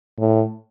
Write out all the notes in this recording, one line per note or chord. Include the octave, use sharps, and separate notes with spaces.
A2